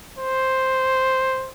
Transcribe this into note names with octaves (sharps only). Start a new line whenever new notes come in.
C5